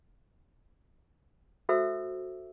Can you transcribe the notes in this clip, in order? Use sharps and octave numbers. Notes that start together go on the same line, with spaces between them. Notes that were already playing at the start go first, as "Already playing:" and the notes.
F#4 A4 C5 E5 E6